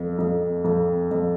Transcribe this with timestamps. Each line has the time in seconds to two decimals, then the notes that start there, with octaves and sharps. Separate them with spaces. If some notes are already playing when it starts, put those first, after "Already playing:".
Already playing: F2
0.18 F2
0.64 F2
1.11 F2